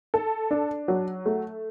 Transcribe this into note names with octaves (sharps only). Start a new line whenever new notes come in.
A4
D4
F#3
A3